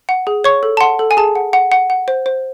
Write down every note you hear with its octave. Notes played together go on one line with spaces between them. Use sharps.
F#5
G#4
C#5 C#6
A4
A5
F#5 C6
A4
G#5
G#4 A5
F#5
F#5
F#5
F#5
C5
C5